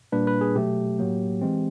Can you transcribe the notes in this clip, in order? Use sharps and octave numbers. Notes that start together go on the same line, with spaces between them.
A#2 G3 A#3 D4 B4
B4
G#4
B2 F#3 A3 G4
A2 F#3 A#3
E3 G#3 C4